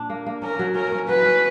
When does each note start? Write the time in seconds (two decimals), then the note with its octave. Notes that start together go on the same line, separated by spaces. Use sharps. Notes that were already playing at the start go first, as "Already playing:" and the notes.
Already playing: A#2 D4
0.10 A#3
0.26 A#3
0.42 C#4 A#4
0.59 F#3
0.75 C#4 A#4
0.92 C#4
1.08 F#3 B4
1.25 C#4